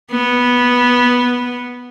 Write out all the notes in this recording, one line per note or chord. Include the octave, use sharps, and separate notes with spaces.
B3